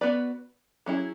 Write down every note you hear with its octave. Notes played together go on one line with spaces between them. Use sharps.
B3 F#4 B4 D5
F#3 C#4 E4 G#4